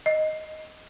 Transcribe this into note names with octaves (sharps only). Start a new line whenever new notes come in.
D#5